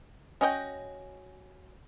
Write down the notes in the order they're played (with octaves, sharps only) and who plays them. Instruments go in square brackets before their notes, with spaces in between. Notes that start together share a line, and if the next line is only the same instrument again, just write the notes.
[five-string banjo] C#4 F#4 D#5 F#5 G5